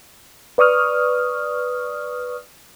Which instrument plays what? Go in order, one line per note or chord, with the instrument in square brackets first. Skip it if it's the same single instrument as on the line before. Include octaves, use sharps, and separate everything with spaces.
[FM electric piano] B4 D5 C#6 D#6 F6